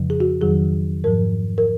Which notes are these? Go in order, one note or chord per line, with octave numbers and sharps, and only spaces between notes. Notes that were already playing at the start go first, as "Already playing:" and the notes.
Already playing: F2 C#3 F3
G#4
F#4
F2 D#3 F#3 G#4
G#2 F3 A#4
A#4